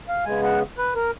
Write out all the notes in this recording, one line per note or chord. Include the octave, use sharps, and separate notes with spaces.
F5
C#3 G#3 B3 G#5
F#5
B4
A#4